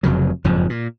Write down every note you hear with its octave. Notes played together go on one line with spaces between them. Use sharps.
F1 F2 C#3 F#3
F#1 F2 G#2 F3
A#2